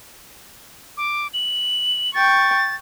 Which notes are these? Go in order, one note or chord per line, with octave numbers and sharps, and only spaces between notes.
D6
F#7
G5 C#6 A6